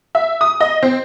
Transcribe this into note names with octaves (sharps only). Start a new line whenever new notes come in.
E5
D#6
D#5
C4